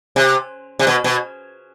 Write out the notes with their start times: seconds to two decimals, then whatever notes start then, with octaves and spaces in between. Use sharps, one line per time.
0.16 C3
0.79 C3
0.87 B2
1.04 B2